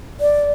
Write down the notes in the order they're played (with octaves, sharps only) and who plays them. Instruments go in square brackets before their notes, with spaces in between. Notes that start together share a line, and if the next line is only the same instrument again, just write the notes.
[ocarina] D5